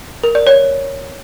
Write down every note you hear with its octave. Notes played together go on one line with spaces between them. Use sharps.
A#4
D5
C#5